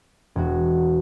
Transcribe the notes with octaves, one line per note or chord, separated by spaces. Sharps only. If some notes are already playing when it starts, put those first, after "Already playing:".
E1 F#4